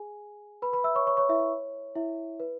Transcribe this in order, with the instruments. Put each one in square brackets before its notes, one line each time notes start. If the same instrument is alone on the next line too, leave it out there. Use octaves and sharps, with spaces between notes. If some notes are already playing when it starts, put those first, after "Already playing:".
Already playing: [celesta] G#4 G#5
B4 B5
B4 B5
E5 E6
C#5 C#6
C#5 C#6
C#5 C#6
E4 E5
C#5
E4 E5
B4